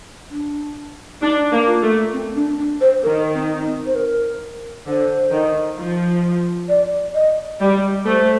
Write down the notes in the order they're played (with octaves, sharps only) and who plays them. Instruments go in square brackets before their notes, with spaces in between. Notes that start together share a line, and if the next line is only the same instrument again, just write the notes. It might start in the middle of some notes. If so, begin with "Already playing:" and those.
[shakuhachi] D4
[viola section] D4 [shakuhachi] D#4
[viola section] A#3
[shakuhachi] F4
[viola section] A3
[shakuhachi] C4
D4
D4
C5
[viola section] D#3 [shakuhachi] A#4
[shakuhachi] C4
C4
C5
A#4
[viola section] D3 [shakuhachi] C5
[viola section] D#3
F3
[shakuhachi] D5
D#5
[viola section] G3 [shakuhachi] D5
[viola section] A3 [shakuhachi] C5